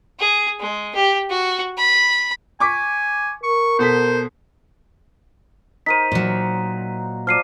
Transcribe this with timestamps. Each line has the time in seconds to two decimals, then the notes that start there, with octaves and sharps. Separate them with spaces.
0.19 G#4
0.60 G#3
0.95 G4
1.30 F#4
1.78 B5
2.60 G#5 C#6 D6 B6
3.43 A#4 C#6
3.79 B2 A4 C5 B6
5.86 D#4 A#4 C5 B6 D#7
6.12 A#2 F#3
7.27 F3 D5 F6 C7 D#7